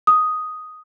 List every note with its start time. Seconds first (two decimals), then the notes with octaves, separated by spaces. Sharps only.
0.07 D#6